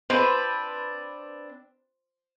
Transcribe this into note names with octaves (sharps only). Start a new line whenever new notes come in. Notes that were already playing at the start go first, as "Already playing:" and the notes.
C4 D4 B4 C5